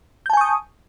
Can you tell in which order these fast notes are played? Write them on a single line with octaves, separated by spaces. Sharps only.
G6 A5 G#5 C#6 D#6